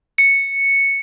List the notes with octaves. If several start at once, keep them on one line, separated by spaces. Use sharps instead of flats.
C#7